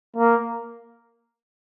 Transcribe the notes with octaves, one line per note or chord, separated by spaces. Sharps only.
A#3